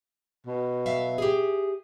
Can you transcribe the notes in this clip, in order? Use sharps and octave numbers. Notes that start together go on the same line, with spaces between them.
B2
F#3 E5 F5
G4 G#4